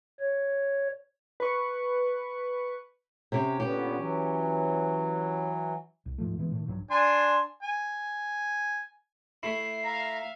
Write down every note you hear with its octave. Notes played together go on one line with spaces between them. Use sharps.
C#5
B4 C#6
C3 C#4 G4
A#2 D3 B3 C#4 G4
E3 F#3
C2
D1 G#2 F3 A3
D3 E3 G#3 B3
A2 D#3
A#1 G2 F#3
D4 G#5 C6
G#5
A3 E4 C7
E5 F5 A#5